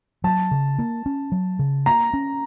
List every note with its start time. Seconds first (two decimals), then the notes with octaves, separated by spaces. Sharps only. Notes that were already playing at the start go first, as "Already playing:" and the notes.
0.24 F#3 A5
0.51 C#3
0.79 A#3
1.06 C#4
1.32 F#3
1.59 C#3
1.86 A#3 A#5
2.14 C#4